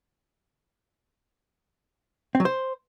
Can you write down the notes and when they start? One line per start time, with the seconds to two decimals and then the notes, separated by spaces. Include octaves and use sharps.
2.35 C4
2.40 F#3
2.45 C5